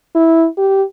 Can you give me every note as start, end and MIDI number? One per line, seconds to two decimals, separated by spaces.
0.15 0.46 64
0.58 0.83 67